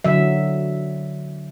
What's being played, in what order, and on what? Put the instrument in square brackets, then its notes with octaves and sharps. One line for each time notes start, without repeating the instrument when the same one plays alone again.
[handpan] D3 F#3 E5